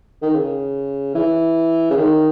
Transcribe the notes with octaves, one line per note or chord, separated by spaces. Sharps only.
D#3
C#3
E3
C#3
D#3